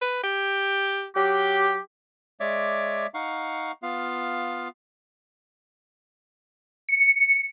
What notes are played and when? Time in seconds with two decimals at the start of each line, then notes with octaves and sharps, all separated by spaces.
0.02 B4
0.24 G4
1.16 F#3 G4
2.40 G#3 C#5 D5 E5 D6
3.14 D#4 F5 F#5 C#6
3.82 B3 F4 F5
6.89 C#7